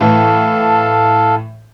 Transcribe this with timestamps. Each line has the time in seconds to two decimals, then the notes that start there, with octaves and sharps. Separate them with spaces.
0.01 A2 E3 A4 F5 A5